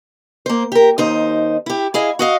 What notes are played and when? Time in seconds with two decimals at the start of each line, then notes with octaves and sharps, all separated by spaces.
0.46 A#3 C5
0.72 G4 A#4
0.98 D#2 D#4 C5
1.66 E4 G4
1.94 E4 G#4 D#5 F5
2.19 F#4 D#5 F5